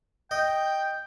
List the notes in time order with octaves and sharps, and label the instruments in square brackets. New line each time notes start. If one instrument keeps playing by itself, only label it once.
[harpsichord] D#5 [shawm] G5